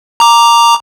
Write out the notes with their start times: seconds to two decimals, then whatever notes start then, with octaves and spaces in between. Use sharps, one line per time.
0.20 A#5 D6